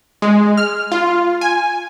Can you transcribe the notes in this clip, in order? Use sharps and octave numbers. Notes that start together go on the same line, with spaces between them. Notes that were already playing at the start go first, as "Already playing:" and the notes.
G#3
F6
F4
G#5